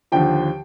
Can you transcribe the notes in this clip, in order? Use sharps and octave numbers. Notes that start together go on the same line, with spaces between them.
D#2 D3 F3 G5